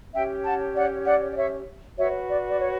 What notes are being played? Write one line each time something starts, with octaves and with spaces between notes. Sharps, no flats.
C#4 G4 C#5 E5 G5
F#5 A5
D5 F#5
D5 F#5
D5
C#5 E5
F#4 B4 C#5 E5
D5
D5
C#5